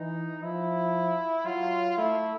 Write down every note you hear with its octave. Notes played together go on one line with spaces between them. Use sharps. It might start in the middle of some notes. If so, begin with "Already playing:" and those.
Already playing: E3 D#4
F3 E4
F#3 F4
A3 E4